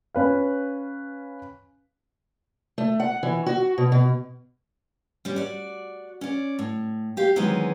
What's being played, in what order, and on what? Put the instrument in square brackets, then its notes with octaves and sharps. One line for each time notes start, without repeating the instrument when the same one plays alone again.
[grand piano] C#4 B4 F5
[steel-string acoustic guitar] A3
F#5
E3
F#4
B2
B2
G3 C#4
F#4 D5
C#4 D5
A2
G4 F5
D#3 E3 F#3 G#3 B3 C4